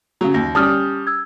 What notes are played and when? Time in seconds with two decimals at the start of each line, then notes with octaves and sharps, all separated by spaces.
0.21 C#3 F#3
0.34 D#2 A#6
0.55 G3 C#4 A5 D#6 F6
1.07 E6 G#6